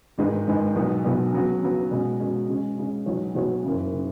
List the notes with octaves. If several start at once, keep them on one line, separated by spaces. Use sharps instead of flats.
G#1 G#2 G#3 D#4 B4
G#1 G#2 G#3 D#4 B4
B1 B2 B3
B1 B2 B3
C#3 F#3 B3
C#3 F#3 B3
B2 G#3 C#4
B2 G#3 C#4
C#3 G#3 C#4
C#3 G#3 C#4
B1 B2 B3 F#4 C#5
B1 B2 B3 F#4 C#5
F#1 F#2 C#3
C#3